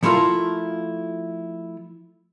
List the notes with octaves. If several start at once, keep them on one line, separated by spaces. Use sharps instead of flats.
F3 A3 E4 F4 A4 A#4